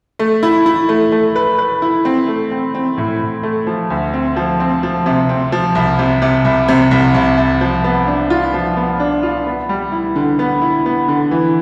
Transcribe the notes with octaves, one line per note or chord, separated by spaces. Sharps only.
A3
E4
E4
A3
A3
B4
B4
E4
C4
A3
C4
C4
A2
A2
A3
F3
D2
C4
F3
C4
F3
C3
C4
F3
C2
C3
C3
C2
C3
C2
C2
C2
F3
B3
D4
F4
F3
B3
D4
F4
B3
G3
E4
D3
B3
E4
B3
D3
E3